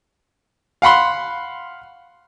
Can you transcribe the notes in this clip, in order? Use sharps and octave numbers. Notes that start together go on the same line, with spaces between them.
F5 F#5 B5 C6